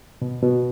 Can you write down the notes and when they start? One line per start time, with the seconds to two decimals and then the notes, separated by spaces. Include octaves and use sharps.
0.22 B2
0.43 B2